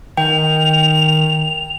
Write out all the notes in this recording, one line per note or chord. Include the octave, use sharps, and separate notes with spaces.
D#3 G5 F7